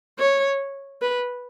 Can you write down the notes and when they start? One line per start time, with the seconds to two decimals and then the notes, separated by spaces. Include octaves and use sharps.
0.19 C#5
1.02 B4